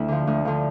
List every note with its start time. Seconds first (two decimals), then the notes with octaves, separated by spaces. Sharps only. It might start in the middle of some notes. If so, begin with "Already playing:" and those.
Already playing: D2 E4
0.08 D3 F3
0.27 D2
0.45 D3 F3